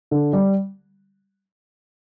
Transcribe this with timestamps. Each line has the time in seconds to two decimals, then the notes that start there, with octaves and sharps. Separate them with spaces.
0.11 D3
0.33 G3